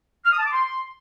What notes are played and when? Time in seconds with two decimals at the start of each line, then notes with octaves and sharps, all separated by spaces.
0.24 F6
0.31 D#6
0.38 A5
0.45 D6
0.51 C6